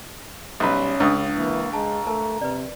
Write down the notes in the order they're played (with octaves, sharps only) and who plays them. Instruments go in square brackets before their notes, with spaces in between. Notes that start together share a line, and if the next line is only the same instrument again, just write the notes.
[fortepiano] B1 B4 [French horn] G3 [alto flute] C#4 [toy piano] E5
[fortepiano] C#2 [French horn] C#3 [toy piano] D4 D#6
[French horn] E3 [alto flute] A#3
[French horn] G#3 [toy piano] A5 [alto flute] A#5
[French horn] A3 [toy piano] A#4 A5
[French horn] C3 [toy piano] B4 D5